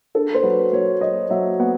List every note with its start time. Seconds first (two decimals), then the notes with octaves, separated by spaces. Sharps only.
0.15 D4 A4
0.34 C5
0.43 F#3 B4
0.72 F#3 C#5
1.01 F#3 D#5
1.30 F#3 E5
1.59 B3 F#5